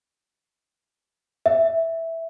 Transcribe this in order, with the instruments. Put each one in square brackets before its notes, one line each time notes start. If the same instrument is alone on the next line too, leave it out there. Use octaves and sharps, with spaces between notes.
[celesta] E5